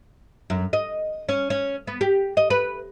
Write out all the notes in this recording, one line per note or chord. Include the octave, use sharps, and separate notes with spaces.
F#2
D#5
C#4
C#4
B3
G4
D#5
B4